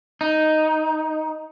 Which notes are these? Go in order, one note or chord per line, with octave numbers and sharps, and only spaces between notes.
D#4